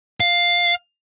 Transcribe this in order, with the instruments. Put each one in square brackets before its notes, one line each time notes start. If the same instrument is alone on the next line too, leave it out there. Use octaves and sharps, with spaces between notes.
[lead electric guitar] F5